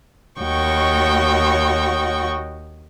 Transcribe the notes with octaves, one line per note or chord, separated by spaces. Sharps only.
D#2 F#4 C#5 D#5 G5 C#6